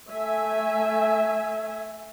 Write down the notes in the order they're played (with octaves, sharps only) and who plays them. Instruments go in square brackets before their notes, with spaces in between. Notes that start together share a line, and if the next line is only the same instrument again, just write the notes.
[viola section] A3 E5 G#5